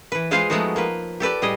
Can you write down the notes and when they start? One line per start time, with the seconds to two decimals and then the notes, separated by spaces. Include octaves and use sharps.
0.12 E3 B4
0.31 G#3 F4 G#4 B4 C5 F5
0.50 F3 G#3 A3 B3 D#4 F#4
0.76 A#3 F4 B4
1.20 G4 A4 B4 D5
1.42 A2 G3 G#4 D#5